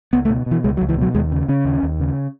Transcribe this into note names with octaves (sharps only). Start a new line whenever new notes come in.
C#2 B3
A3
B2
B2
E3
C#2 G#3
F#3
C#2
E3
B2 F#3
D#2 G#3
C#3
C#3 C#4
D#2
D#2
C#3